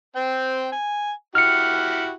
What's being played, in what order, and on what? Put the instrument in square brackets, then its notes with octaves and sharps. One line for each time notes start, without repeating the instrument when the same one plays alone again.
[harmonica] C4 G5
G#5
[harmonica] E4 F#4 G4 [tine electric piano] F6 C#7